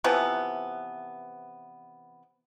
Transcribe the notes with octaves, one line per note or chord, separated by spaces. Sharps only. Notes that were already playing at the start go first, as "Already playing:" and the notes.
C3 E3 F3 B3